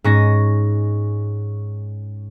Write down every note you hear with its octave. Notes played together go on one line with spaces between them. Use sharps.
G#2 C#4 A#6